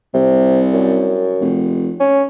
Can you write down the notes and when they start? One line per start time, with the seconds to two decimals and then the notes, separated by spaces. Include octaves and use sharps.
0.14 C2 C3
0.73 F#2
1.41 F1
2.00 C#4